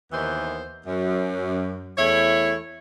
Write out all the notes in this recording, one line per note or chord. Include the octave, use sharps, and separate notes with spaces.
D#2 D#3 E3 B3 C5
F#2
E2 A3 E4 C#5